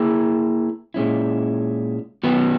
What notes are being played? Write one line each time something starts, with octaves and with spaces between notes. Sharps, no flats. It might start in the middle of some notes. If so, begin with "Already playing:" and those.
Already playing: A#3 E4 G#4
A#2 G#3 C#4 E4
D#3 F#3 B3 F#4 B4